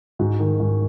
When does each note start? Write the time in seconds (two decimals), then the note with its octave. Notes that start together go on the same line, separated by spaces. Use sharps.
0.19 G#2 F#4
0.39 D#3
0.60 G#2